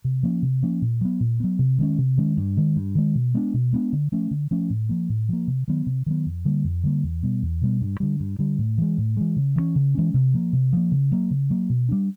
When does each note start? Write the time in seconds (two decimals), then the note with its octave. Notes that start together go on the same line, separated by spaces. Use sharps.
0.04 C3
0.23 F3 A#3 C#4
0.42 C3
0.63 F3 A#3 C#4
0.82 A#2
1.01 F#3 B3
1.20 A#2
1.40 F#3 B3
1.59 C3
1.79 D#3 G#3 C#4
1.98 C3
2.18 D#3 G#3 C#4
2.37 G2
2.57 D#3 G#3
2.76 G2
2.95 D#3 G#3
3.15 B2
3.35 G#3 B3 D4
3.54 B2
3.73 G#3 B3 D4
3.93 D3
4.12 F3 A3 C#4
4.31 D3
4.51 F3 A3 C#4
4.70 A2
4.89 F3 A#3
5.09 A2
5.29 F3 A#3
5.47 C3
5.68 D#3 F#3 B3
5.86 C3
6.06 D#3 F#3 B3
6.26 F2
6.45 D3 G3 A#3
6.64 F2
6.84 D3 G3 A#3
7.03 E2
7.23 B2 G3 B3
7.42 E2
7.62 B2 G3 B3
7.81 G2
8.00 D3 G3
8.20 G2
8.39 D3 G3
8.59 A2
8.78 E3 G#3
8.98 A2
9.17 E3 G#3
9.37 C#3
9.56 E3 G#3 C#4
9.76 C#3
9.95 E3 G#3 C#4
10.14 C3
10.34 F3 A#3
10.53 C3
10.73 F3 A#3
10.92 C#3
11.12 F#3 A#3
11.31 C#3
11.50 F#3 A#3
11.70 B2
11.89 G3 B3 D4